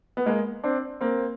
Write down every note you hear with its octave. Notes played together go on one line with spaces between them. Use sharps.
B3
G#3 A#3
C4 D4
A#3 C4